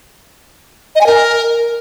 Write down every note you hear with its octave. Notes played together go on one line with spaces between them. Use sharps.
D#5
G#5
A#4